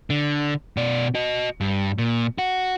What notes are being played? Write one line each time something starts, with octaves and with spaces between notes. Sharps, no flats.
D3
B2 D5
F#4 D#5
G2
A#2
F#4